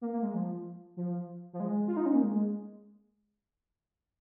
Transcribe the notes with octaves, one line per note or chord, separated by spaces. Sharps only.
A#3
A#3
G#3
F3
F3
F3
G#3
F4
D#4
C#4
A#3
G#3